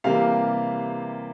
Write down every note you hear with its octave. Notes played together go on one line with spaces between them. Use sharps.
C3 E3 G3 A#3 F5